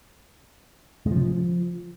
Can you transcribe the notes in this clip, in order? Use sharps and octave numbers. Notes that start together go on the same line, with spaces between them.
G#3
F3
C#3
F3